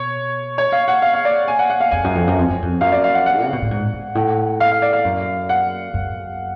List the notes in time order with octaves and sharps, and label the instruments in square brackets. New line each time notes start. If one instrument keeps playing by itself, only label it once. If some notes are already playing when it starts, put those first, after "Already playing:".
Already playing: [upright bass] B2 [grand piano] C#5
[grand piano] C#5
F5
F#5
F5
F5
D5
G#5
F#5
F#5
F5
[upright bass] F2 [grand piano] G#5
[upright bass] F#2
F2
F#2
F2
F#2
F2
[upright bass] F#2 [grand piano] F5
[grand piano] D5
F5
F#5
F#5
[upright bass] C#3
B2
A2
G#2
G#2
A2
[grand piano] F5
F5
D5
F5
[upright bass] F#2
[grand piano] F#5
[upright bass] F#2